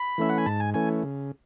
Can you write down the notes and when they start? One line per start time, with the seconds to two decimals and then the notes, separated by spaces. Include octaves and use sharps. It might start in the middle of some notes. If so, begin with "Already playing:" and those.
Already playing: B5
0.18 E3 A3 C#4 E5
0.29 F#5
0.38 G#5
0.46 G#2 A5
0.60 G#5
0.74 E3 A3 C#4 G#5
1.03 C#3